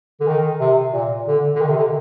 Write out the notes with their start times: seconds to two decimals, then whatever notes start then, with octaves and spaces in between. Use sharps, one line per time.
0.21 D3
0.28 D#3
0.60 C3
0.94 A#2
1.28 D3
1.56 D3
1.61 D#3
1.69 C3
1.78 D3